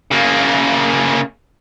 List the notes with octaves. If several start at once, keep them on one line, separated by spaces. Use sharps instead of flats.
C#3 A#3